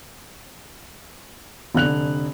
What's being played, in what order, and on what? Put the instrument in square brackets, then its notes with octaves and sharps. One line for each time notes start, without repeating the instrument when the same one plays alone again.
[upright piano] F1 D3 F#6 F7